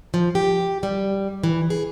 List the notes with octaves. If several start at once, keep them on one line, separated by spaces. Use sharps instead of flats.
F3
G4
G3
E3
G#4